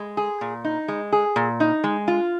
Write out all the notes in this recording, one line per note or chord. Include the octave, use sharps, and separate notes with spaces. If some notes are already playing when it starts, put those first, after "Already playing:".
Already playing: G#3
G#4
A#2
D#4
G#3
G#4
A#2
D#4
G#3
F4